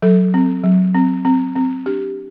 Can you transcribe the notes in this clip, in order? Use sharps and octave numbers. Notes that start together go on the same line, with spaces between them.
F#3 A4
C4
F#3
C4
C4
C4
D4 G4